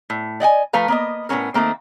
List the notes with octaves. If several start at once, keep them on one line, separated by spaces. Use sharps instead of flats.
A2
D5 D#5 F#5 G#5
F3 A3 B4 F5 A#5
A#3 B3 D#5
A2 A#3 B3 C#4 A#4
D#3 A3 A#3 C4